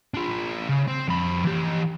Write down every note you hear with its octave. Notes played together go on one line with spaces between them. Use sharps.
D4 F4
C#3
C4
F2 B5
E3 G4